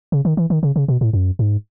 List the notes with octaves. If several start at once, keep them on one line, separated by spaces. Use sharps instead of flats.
C#3
D#3
E3
D#3
C#3
C#3
B2
A2
F#2
G#2